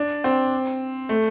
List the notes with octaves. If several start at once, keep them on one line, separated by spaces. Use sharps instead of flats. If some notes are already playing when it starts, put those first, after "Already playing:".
Already playing: D4
C4
A3